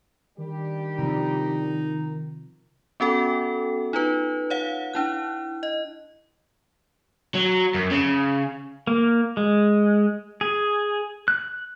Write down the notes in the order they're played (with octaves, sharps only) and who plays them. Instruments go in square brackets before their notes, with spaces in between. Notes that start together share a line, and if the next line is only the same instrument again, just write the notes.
[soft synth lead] D#3 [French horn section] G3 D4 G4
[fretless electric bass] C3 F3 [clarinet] D#4
[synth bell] B3 C#4 F#4 A4 G5
D#4 F4 B4
C#5 F5 F#5
D4 E4 F#6
D#5
[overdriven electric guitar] F#3
F#2
C#3
[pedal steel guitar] A#3
G#3
G#4
F#6